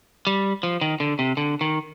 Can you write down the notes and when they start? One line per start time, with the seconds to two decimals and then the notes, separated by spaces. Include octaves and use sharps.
0.27 G3
0.63 F3
0.81 D#3
1.00 D3
1.19 C3
1.37 D3
1.61 D#3